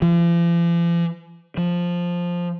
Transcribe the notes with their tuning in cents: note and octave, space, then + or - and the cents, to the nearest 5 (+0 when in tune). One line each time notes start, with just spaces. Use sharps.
F3 -45
F3 +5